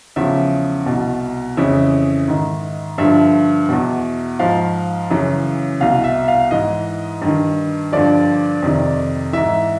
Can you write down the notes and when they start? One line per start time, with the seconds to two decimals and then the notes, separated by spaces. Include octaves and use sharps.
0.16 E2 C#3 F3 E5
0.86 C2 B2
1.57 F2 C#3 E3 E5
2.28 G#2 D#3
2.98 G2 D3 F3 E5
3.69 E2 B2
4.39 G#2 F3 F5
5.10 F#2 C#3 E3
5.80 C2 B2 F5
6.04 E5
6.28 F5
6.51 G#2 E3 D#5
7.22 G2 D#3
7.92 G2 D3 F3 D5
8.62 F2 C3 D#3
9.33 G#2 E3 E5